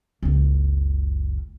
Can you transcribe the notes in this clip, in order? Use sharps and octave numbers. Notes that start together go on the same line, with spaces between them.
F#1 C#2